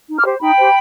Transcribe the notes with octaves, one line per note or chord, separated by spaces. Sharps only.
D#4
D6 F6
G4 C5
D#4 G5 B5
G4 C5